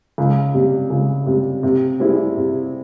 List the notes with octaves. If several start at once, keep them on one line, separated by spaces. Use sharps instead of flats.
C#2
C3 G3
C#2
C3 G3
C3
G3 C4 E4 G#4
C3